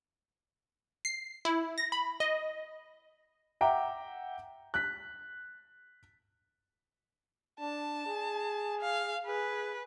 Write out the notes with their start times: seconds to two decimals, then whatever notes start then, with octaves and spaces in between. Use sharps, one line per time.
1.05 C7
1.45 E4
1.78 A#6
1.92 B5
2.20 D#5
3.61 E5 F#5 G5 A#5 D6
4.74 F#6 B6
7.60 D4 A5
8.06 G#4
8.81 F5
9.27 G#4 B4